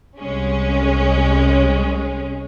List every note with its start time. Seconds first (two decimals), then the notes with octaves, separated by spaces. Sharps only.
0.18 C2 G#3 C#4